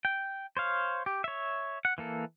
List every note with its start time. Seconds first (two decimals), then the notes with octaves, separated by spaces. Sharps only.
0.05 G5
0.57 C5 C#5 F5
1.06 G4
1.24 C#5 E5
1.85 F#5
1.98 E3 A#3 A4